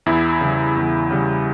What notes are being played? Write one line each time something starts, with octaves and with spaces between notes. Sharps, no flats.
E2 E4
C#3 G3
E2
C#3 G3